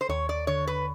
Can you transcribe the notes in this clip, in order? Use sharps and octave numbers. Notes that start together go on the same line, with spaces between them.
C5
D#2 C#5
D5
D3 C#5
B4